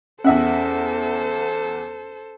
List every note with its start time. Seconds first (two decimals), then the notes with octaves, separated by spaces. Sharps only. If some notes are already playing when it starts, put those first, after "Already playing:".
0.24 E2 C#4 A4 C5 E5 F#5